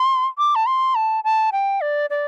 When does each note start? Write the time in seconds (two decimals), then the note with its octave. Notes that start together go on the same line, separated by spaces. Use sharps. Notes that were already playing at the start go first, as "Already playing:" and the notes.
Already playing: C6
0.38 D6
0.55 A5
0.66 C6
0.95 A5
1.24 A5
1.52 G5
1.81 D5
2.10 D5